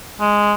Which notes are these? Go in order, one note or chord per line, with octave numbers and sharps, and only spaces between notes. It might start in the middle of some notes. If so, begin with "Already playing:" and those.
G#3